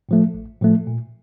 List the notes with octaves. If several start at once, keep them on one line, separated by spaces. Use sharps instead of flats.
A2 F3 A3
A1
A2 F3 A3
A#2